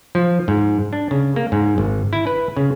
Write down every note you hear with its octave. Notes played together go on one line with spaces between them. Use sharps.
F3
G#2
D4
C#3
A#3
G#2
G#1
E4
B4
C#3